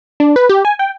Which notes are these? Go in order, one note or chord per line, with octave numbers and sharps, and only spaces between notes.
D4
B4
G4
G#5
G5